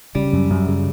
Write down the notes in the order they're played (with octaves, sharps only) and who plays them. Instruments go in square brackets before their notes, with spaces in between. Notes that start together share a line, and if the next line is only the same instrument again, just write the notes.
[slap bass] C#3 [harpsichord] G3
[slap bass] F#2
F#2
C#3